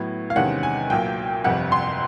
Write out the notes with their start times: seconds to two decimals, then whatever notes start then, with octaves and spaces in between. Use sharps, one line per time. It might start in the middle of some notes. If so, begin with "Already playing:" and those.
Already playing: A2 F#3 B3
0.30 F5
0.36 E2 C3 D#3 G#3 C#4 F#5
0.63 G#5
0.90 B1 A#2 F#3 G5
1.44 G1 F2 C3 F#5
1.72 C6